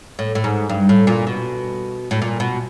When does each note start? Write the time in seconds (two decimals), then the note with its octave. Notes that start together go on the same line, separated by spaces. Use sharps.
0.19 A2
0.35 A2
0.44 G#2
0.69 G2
0.89 A2
1.07 A#2
1.27 B2
2.11 A2
2.22 A#2
2.40 B2